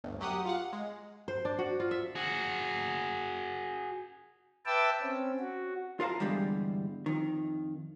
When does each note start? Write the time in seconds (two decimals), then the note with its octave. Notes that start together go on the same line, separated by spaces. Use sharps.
0.04 G1 D2
0.20 F#2 F#3 G4 F#5 D#6
0.45 F4 F5 F#5
0.73 G#3
1.28 C5
1.45 D4
1.59 F#4
1.80 F4
1.91 E5
2.15 F#4 G#4
4.66 B4 E5 G5 A5 D6 E6
5.02 C4 C#4
5.40 F#4
6.00 F4 A#4 F5 A5 A#5
6.20 E2 G2 D3 G3 G#3
7.06 F2 D#3